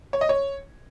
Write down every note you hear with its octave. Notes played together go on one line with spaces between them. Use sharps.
C#5
D#5
C#5